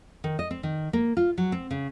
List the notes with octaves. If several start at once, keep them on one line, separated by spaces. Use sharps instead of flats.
D#3
D#5
C4
D#3
A#3
F4
F#3
C4
C#3